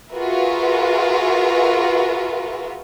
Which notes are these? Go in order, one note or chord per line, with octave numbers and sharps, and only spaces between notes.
F4 F#4 G#4 A#4 B4 E5